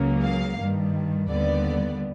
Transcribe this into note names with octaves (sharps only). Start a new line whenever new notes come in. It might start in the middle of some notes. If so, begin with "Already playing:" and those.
Already playing: C#2 C#3 F#3 A#3
F5
G2 D#3 G3
D#2 D3 G3 B3 D5